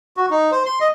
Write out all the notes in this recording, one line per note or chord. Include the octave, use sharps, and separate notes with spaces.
F#4
D#4
C5
C6
D#5